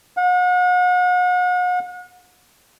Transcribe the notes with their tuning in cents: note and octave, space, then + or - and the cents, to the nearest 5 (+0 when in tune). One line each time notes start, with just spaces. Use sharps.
F#5 -40